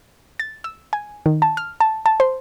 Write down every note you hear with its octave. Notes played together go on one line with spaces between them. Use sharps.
A6
E6
G#5
D#3
A5
F6
A5
A5
C5